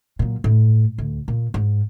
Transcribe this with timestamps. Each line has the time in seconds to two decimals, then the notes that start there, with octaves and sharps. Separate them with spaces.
0.19 A#2 F#3
0.44 A2
0.98 D2
1.28 A#2
1.54 G#2